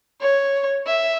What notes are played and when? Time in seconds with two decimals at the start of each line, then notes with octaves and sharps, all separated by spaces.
0.21 C#5
0.87 E5